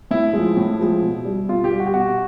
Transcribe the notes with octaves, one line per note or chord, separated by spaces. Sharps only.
A2 E4
F3 G#3
A2
F3 G#3
B2
G3
B2 F4
G4
G3
F#4
G4
B2 F#4